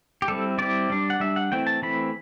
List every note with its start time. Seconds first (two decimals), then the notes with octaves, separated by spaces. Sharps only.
0.22 G4
0.28 G3 C4 E4 A4
0.58 G3 C4 E4 D5
0.90 G3 D4
1.10 F#5
1.20 G3 D4 E5
1.36 F#5
1.51 E3 A3 C4 E4 G5
1.67 A5
1.82 E3 A3 C4 E4 B5